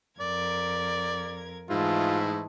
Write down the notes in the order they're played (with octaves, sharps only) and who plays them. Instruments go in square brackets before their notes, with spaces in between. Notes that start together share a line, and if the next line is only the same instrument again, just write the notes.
[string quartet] F2 A#4 G#6 [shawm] D5
[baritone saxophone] G#2 [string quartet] E3 G#3 A3 [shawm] E4 [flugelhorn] F4